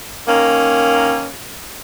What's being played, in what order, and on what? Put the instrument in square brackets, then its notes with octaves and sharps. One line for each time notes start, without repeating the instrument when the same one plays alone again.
[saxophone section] D#3 A#3 C#4